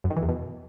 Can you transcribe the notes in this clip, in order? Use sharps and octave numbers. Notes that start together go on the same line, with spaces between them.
F#2
D#3
E3
E2
B2